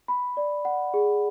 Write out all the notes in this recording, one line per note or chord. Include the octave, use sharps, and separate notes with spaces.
B5
D5
F#5
G#4